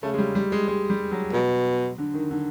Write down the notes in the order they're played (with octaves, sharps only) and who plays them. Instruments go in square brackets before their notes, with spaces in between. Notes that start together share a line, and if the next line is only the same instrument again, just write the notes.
[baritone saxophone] C#3 [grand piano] A3
[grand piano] G#3
G3
G3
G#3
G#3
G3
F#3
[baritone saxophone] B2
[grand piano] D3
D#3
D3